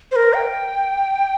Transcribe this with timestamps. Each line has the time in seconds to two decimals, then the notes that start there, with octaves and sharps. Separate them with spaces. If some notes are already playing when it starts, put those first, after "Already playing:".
0.12 C5
0.16 A#4
0.34 G5